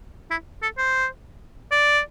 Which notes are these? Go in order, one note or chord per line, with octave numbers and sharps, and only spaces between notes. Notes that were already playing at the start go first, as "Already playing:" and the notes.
E4
A4
C5
D5